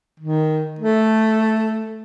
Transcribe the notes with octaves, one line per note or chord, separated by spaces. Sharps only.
D#3
A3